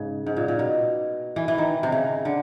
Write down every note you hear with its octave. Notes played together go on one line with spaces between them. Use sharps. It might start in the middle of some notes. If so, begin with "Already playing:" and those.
Already playing: G#2 C#3
G#2
A#2
A#2
B2
E3
E3
D#3
C3
C#3
D3